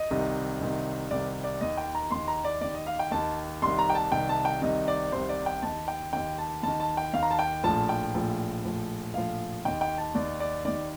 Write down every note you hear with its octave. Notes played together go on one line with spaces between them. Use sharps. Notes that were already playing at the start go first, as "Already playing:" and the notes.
Already playing: D#5
C2 C3 D#3
C2 C3 D#3
C2 C3 D#3 D5
D5
D#2 D#3 D#5
G5
A#5
D#2 D#3 C6
A#5
D5
D#2 D#3 D5
D#5
F5
G5
D#2 D#3 A5
C2 C3 D#3 C6
A#5
G5
A5
C2 C3 D#3 G5
A5
G5
C2 C3 D#3 D#5
D5
C2 C3 D#3 C5
D5
G5
D#2 D#3 A5
G5
D#2 D#3 G5
A5
D#2 D#3 A5
A5
G5
D#2 D#3 F5
A#5
A5
G5
A#1 A2 F3 A5
G5
A#1 A2 F3
A#1 A2 F3
A#1 A2 F3 F5
D#2 D#3 G5
G5
A5
D#2 D#3 D5
D5
D#2 D#3 D5